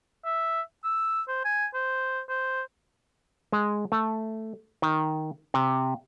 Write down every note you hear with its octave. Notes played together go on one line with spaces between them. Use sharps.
E5
E6
C5
G#5
C5
C5
G#3
A3
D#3
C3